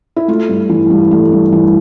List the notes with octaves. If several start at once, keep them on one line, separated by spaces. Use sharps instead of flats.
E4
A3 F4
G2
E3
G2
A3
G2
E3